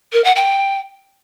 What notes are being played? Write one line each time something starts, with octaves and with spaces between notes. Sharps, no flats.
A#4
F#5
G5